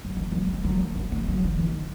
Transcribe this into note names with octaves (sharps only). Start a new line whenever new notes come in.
F#3
E3
F#3
G#3
F#3
A3
B3
A3
F#3
E3
D#3